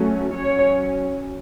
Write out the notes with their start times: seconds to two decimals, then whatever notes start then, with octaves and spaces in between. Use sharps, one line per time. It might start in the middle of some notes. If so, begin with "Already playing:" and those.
Already playing: F#3 A3 C#4
0.33 F#3 C#4 C#5